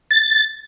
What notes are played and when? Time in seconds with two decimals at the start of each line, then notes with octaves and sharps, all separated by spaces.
0.11 A6